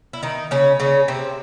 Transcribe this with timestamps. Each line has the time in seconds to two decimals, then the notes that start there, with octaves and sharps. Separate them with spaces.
0.13 E4
0.23 D#3 D#4
0.51 C#3 C#4
0.80 C#3 C#4
1.08 C3 C4